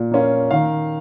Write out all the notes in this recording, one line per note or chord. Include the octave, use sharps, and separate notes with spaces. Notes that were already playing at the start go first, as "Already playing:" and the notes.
Already playing: A#2
A#3 C#4 F4
D#3 F5